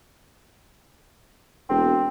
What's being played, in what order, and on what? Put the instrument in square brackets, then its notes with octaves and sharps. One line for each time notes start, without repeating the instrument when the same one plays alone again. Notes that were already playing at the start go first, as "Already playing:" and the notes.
[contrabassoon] E1 [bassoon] C4